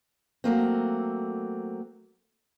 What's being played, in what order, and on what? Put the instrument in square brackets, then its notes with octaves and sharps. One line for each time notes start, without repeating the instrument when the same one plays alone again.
[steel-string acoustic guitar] F#3 A3 A#3 C4